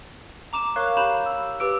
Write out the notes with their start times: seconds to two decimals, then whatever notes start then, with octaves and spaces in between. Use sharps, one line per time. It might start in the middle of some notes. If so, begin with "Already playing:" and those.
0.53 A#5 D6 E7
0.76 A#4 C#5 F5 C#6 F#6
0.97 G4 A#5 B5 G6 E7 F7
1.26 E6
1.60 G4 B4 D6 E6 D7